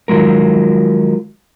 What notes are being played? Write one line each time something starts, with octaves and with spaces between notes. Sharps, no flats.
D#3 F3 F#3 G#3 A#4